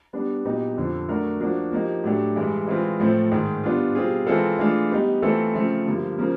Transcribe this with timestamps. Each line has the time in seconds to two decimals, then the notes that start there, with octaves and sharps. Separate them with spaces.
0.13 G3 B3 D4
0.45 A#2 F#3 B3 D#4 G4
0.77 F2 D3 F3
1.08 F#3 A3 D4 F#4 A#4
1.40 F3 A#3 D4 F#4
1.72 F3 A#3 D#4 G4
2.04 A2 F#3 A3 D4 G4
2.36 G2 E3 G#3
2.67 E3 G#3 C4 F4 G#4
3.00 A2 F3 A3 C4
3.31 G#2 D#3 G#3
3.64 G3 B3 D4 F4
3.95 B2 G3 C4 F4 G#4
4.27 E3 G#3 C4 F4 A4
4.59 E3 A3 D4 F4 G#4
4.91 G3 B3 D#4 G4
5.22 E3 A3 C4 F4 A4
5.54 C#3 F3 A3 C4
5.86 G2 D3 F3 A#3
6.18 C#3 F3 A#3